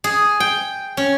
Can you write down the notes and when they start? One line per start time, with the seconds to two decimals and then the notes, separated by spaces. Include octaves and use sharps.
0.04 G#4
0.40 G5
0.97 C#4